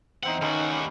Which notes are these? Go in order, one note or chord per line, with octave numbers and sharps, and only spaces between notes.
E2 C4 D#4 C5 E5 F#5
D#2 D#3 C#4 F#4 A4 B4 C5
G3 D6